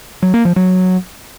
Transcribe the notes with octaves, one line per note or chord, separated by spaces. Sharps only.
F#3
A#3
F3
F#3